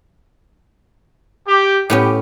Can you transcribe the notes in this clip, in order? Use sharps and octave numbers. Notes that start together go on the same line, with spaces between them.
G4
A2 B3 C#4 G4